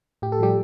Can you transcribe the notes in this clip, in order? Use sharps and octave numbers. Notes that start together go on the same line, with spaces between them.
A2 G4
A4
F3 G3 G4